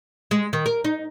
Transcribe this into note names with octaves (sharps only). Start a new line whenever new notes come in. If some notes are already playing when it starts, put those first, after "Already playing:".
G#3
D#3
A#4
D#4